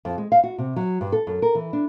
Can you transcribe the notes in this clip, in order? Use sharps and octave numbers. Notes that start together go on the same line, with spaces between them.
F2
G#3
F5
F#4
C3
F#3
G2
A4
F#2
A#4
E3
D4